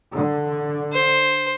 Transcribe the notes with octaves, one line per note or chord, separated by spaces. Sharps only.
D3
C5